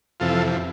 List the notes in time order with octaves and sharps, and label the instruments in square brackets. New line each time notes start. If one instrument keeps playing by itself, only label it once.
[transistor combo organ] F2 C3 E3 F4 A4